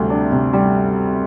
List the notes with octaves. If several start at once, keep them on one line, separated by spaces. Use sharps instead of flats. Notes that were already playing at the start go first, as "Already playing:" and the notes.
Already playing: D2 C3 G3
D4
C3
G3